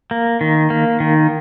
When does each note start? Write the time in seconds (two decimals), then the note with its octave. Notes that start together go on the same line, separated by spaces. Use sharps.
0.11 A#3
0.41 D#3
0.70 A#3
1.00 D#3